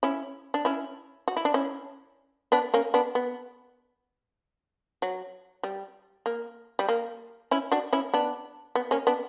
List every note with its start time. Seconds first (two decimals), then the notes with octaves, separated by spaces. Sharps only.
0.03 C#4 E4
0.54 D4
0.65 C#4 E4
1.28 F#4
1.37 E4
1.45 D4
1.54 C#4 E4
2.52 B3 D4
2.74 A#3 C#4
2.94 B3 D4
3.15 B3
5.02 F#3
5.63 G3
6.26 A#3
6.79 G3
6.89 A#3
7.51 C#4 E4
7.72 D4 F#4
7.93 C#4 E4
8.14 B3 D4
8.75 B3
8.91 A#3 C#4
9.07 B3 D4